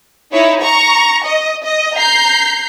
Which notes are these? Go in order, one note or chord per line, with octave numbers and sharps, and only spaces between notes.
D#4 E4 C#5
A#5 C#6
D#5
D#5
A#5 G6 C7